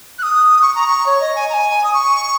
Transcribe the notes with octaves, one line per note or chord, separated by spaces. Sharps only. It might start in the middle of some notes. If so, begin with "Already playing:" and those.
F#6
D#6
C#6
A#5
C#6
C#5
D#5
G#5
A#5
G#5
D#6
C#6